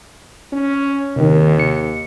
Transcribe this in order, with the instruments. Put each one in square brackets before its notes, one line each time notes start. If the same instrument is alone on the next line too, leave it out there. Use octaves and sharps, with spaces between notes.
[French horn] C#4
[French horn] D#2 [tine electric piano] C3 D#3
[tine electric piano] C#7